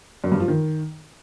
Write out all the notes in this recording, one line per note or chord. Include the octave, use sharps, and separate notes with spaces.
F#2
G2
F3
D#3